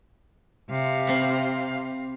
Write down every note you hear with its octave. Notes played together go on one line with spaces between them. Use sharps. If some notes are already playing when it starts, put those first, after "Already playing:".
C3 F5
C4 B5